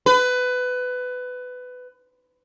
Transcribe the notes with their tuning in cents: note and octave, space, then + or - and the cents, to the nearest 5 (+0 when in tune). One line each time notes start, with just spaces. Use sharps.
B4 +20